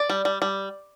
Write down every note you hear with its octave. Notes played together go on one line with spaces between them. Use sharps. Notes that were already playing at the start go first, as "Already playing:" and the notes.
Already playing: D5
G3
G3
G3